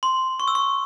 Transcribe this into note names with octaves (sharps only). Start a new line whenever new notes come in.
C6
C#6
E6
C#6